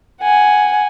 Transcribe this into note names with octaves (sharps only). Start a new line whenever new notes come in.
F#5 G#5